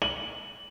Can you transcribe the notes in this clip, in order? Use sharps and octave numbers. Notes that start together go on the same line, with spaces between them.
F#7